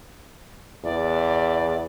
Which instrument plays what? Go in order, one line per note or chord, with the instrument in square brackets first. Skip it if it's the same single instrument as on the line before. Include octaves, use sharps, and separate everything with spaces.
[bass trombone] E2 [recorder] D5